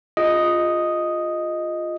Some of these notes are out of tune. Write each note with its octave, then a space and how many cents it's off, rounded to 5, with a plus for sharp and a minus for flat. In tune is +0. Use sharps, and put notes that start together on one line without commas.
F4 +0 G#4 -30 D#5 +0